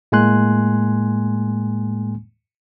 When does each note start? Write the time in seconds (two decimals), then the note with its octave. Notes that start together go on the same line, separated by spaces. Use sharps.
0.12 A2 G#3 A#3 G#5 C6 F#6